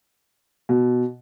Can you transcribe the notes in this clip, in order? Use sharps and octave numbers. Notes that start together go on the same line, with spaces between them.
B2